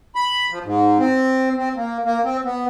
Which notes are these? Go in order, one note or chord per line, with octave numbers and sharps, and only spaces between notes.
B5
F3
G#2
C4
C4
A#3
A#3
C4
B3